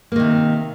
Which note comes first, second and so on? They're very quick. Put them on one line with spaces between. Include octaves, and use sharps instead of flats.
A#3 D#3 C3